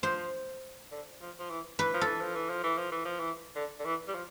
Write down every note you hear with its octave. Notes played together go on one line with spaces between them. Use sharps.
F3 C5
D3
F3
F3
E3
E3 B4
F3
A4
E3
F3
E3
F3
E3
F3
E3
F3
E3
D3
D3
E3
G3
F3